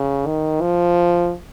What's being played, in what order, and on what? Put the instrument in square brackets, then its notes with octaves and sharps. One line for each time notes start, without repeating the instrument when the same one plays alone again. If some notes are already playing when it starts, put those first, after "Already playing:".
Already playing: [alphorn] C#3
D#3
F3